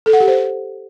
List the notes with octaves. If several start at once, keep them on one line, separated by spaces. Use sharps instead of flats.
A4
F#5
G4
C5